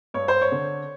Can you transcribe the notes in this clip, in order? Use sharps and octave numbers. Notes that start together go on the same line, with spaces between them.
G2 C#5
C5
C#5
D3